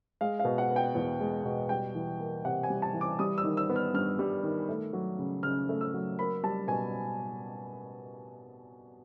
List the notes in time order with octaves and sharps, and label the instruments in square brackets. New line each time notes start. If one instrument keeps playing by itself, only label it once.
[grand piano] G#3 F5
F5
B2
F#5
B3
G5
E2
G#3
B2
G3 G5
E3
A#3
C3 F#5
G#5
G3
A5
E3
D6
G3 D#6
E6
D#3
E6
B3
F6
G2 F6
G3
D#3
A3
F#3
C#3
C#3 F6
A3
E6
F#3
A#3 B5
G3 A5
B2 G#5